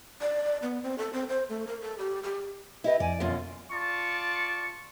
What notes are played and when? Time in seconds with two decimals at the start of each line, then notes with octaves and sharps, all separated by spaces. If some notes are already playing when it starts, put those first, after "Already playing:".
0.21 D5
0.63 B3
0.83 C4
0.98 A4
1.13 C4
1.29 C5
1.49 A3
1.67 A#4
1.82 A4
1.99 G4
2.23 G4
2.84 E4 G4 B4 D#5
3.00 F2 D5 G#5
3.20 F#2 B2 D3 F4
3.72 F4 D5 A5 C#6